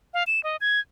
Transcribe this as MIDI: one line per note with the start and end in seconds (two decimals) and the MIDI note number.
0.14 0.23 77
0.27 0.43 100
0.43 0.56 75
0.61 0.80 92